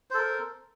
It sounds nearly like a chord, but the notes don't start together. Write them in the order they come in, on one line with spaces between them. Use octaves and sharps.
C5 A4 A#4